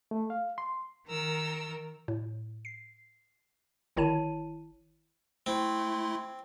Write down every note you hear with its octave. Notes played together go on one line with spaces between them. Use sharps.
A3
F5
C6
D#3 A#4 E6
A2
C7
G1 D#3 E4 C#5 A5 D#7
A3 C4 E4 C6